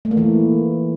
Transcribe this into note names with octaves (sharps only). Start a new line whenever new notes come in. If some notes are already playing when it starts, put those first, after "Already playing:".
A3
A#3
E3